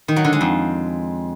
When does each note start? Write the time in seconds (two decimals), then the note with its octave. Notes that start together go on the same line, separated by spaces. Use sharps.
0.08 D#3
0.16 F#3
0.24 D3
0.33 G#3
0.41 F2